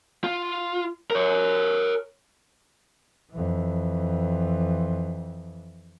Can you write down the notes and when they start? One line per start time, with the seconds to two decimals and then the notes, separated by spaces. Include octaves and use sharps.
0.24 F4
1.11 A#4 C#5
3.32 F2 E3